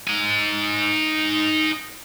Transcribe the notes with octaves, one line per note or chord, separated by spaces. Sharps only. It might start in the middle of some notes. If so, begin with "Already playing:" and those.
D#4 G#5